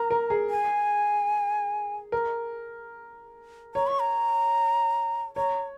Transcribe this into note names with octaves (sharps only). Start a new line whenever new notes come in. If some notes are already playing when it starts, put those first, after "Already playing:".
Already playing: A#4 A#5
A#4
G#4
G#5
A#4
C#5 A#5
C#6
A#5
C#5 A#5